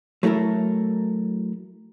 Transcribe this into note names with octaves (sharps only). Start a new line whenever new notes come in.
F#3 A3 E4 A4 A#4